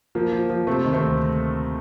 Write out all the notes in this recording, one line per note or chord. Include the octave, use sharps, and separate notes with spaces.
F3 A#3
F3
F3
C3 A3 C4
D#3
A3 C4
D2